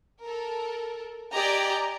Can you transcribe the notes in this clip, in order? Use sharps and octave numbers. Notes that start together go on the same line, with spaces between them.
A4 A#4
G4 D5 D#5 G#5 A#5